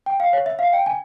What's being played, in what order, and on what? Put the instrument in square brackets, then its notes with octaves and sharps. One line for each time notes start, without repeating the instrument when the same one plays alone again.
[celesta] G5
F5
C#5
E5
F5
G5
G#5